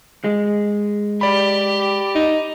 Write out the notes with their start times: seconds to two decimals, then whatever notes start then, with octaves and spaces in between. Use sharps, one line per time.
0.24 G#3
1.21 G4 D5 B5
2.15 D#4